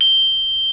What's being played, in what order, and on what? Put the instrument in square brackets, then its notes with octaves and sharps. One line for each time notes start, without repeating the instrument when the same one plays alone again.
[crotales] G7